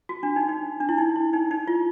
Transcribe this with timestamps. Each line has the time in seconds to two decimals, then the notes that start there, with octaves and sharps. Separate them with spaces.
0.09 F#4
0.23 D4
0.36 D#4
0.49 D#4
0.80 D4
0.89 E4
0.98 D#4
1.16 E4
1.33 D#4
1.51 D#4
1.67 F4